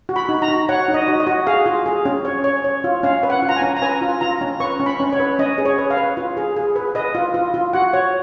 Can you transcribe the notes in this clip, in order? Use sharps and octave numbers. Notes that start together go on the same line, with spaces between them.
F#4
B5
D#4
A#5
F#4
C#5 F#5
D#4
D#5
F#4
D#5
F#4
G#4 F5
F4
G#4
C#4
C#5
C#5
C#5
F4
C#4 F5
B4
F#5
F4
A#5
G#5
C#4
A#5
B4 G#5
F4
F4 A#5
C#4
B4 C#6
C#4
B5
C#4
C#5
B4
C#4 D#5
G#4
C#5
B4
F5
B4
F4
G#4
G#4
B4
B4 D#5
F4
F4
F4
F#4 F#5
C#5